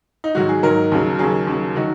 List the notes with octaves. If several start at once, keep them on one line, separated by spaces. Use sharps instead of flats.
D#4
G#2 D#3 F#3 F#4
G#4
G#2 D#3 F#3 A#4
D#2 C#3 F#3
D#2 C#3 F#3 G#4
D#2 C#3 F#3
D#3 F#3 F#4